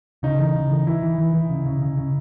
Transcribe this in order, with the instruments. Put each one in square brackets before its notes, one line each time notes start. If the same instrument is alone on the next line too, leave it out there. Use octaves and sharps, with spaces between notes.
[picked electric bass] C#3 [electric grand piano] D#4
[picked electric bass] E3
C#3
E3
[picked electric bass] E3 [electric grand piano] E4
[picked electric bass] E3
E3
E3
C#3
C#3
C#3
C#3